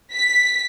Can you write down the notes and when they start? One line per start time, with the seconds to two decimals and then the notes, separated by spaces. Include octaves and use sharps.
0.14 B6